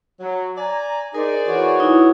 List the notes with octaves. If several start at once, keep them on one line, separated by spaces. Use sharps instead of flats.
F#3
D5 G#5 A#5
D#4 G#4 A#4 C5 D5
E3 F#4 C#5
D#4 E4